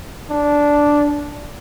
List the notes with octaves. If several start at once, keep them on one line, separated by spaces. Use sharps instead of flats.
D4